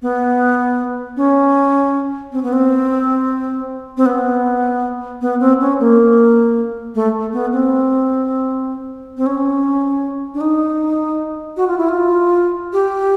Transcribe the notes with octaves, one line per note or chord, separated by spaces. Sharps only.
B3
C#4
C4
B3
C4
C4
B3
B3
C4
C#4
A#3
A3
B3
C4
C4
C#4
D4
D#4
F#4
F4
E4
F4
G4